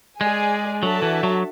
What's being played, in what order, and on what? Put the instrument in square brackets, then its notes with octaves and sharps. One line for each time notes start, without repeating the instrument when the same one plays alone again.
[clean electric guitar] G#3 [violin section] G#4 D5 G#5
[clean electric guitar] F#3 [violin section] D4 F#4 A4 E5 A5
[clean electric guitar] E3
F#3